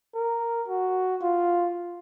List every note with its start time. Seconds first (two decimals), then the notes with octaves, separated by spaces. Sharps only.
0.15 A#4
0.68 F#4
1.22 F4